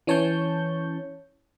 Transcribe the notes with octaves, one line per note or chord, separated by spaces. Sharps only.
E3 C#4 C#5 A5 C#6 G6